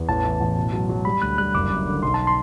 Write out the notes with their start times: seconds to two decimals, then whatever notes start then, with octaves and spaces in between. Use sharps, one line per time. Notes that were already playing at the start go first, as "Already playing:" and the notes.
Already playing: E2
0.09 A1 A5
0.25 E3
0.40 A1
0.57 B2
0.73 F#3
0.89 F#3
1.05 G3 B5
1.22 D2 F#6
1.38 G3 F#6
1.54 F#1 D6
1.70 F#2
1.86 D3
2.03 B1 C6
2.14 A5
2.27 C6